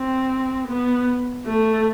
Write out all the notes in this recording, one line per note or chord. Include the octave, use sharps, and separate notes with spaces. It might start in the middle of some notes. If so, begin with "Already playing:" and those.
Already playing: C4
B3
A3